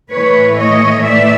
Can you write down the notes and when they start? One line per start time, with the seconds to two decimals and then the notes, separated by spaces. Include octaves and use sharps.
0.11 A2 E3 A3 B4 C#5
0.58 C#5 D#5
1.05 D5 E5